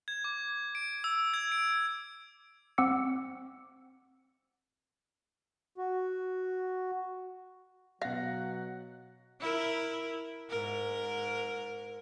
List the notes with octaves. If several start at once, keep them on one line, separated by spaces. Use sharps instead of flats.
G#6
D6
D7
E6
G#6
D7
C4 F#5 D6 E6 C#7
F#4
B2 F#3 F5 F#5 A#6
E4 A#4
G#2 A#4